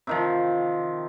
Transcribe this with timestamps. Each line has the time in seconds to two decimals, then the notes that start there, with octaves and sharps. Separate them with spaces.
0.07 C3 D#3 F3